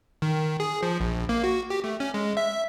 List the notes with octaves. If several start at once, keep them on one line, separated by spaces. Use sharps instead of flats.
D#3
G#4
F3
A#1
A#3
F#4
G4
A3
C#4
G#3
E5